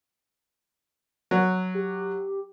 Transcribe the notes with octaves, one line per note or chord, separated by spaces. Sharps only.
F#3
G4